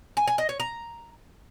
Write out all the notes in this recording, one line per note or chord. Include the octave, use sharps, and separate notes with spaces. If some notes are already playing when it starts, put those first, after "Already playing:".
G#5
G#5
D#5
C#5
A#5